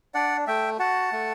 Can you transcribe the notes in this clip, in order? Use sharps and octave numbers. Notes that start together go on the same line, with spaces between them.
D4 D5 F#5
A3 E5 G5
F#4 F#5 A5
A3